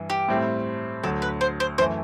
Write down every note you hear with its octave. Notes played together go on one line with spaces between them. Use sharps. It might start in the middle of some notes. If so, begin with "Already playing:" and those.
Already playing: G2 E3
G4
A2 G3 C4 E4
D2 D3 F#3 A4
B4
C5
C5
F#2 E3 A3 E4 C5